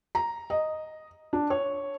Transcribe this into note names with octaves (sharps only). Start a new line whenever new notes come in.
A#5
D#5
D4
C#5